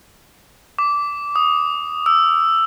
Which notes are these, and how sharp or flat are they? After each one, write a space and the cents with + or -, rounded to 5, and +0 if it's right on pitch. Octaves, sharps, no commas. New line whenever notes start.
D6 -15
D#6 -5
E6 +10